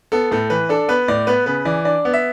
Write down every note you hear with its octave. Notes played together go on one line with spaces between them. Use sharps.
B3 A4
A2 A4
E3 B4
D4 A4
B3 B4
A2 D5
B3 B4
C#3 B4
E3 D5
D4 D5
B3
E5